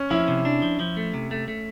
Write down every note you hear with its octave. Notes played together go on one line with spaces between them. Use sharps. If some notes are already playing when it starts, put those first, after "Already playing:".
Already playing: C#4
F3 E4
C3
D4
F3
F3
A3
C3
A3
A3